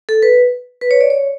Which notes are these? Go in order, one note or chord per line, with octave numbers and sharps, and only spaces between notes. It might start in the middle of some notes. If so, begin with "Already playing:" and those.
A4
B4
B4
C#5
D5
C#5